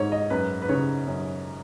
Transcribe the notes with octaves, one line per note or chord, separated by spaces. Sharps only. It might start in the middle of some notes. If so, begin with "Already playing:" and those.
Already playing: G#2 C#5
D#5
F#2 B4
B4
C#3 C#5
F#2